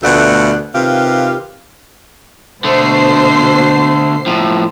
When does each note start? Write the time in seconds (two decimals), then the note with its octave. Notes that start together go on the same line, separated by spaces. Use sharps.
0.03 D2 B2 A3 F4 D5 F#5
0.74 C3 D#3 F4 G4 B4 F5
2.64 B2 D3 A3 C5 C7
4.27 A2 F3